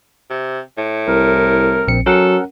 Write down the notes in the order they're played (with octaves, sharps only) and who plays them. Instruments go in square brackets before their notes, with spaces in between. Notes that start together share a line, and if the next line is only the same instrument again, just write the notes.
[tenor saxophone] C3
A2
[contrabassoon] C2 [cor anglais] A#4
[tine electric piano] A#1 C4 C#7
[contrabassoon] F#3 [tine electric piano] C#4 A#4 F#5 [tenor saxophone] A4